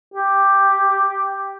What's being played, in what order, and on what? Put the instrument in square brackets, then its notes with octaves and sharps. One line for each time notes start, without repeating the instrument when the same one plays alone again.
[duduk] G4